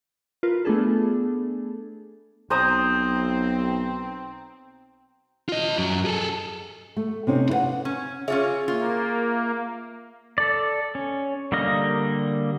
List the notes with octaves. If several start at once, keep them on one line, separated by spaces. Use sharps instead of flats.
F4 A#4 B4
A3 B3 D4 G#4 A4
B1 C4 C5 A#5 D#6
F4 D#5
F#2 F#3
G#4 A4
A3
C3 C4 C#4 D#4
E4 B4 D5 F5 F#5
C#4
C#4 F4 G#4 C#5 E5
A#3 F4
A4 D5
C#4
D3 G3 A#3 D#5 F6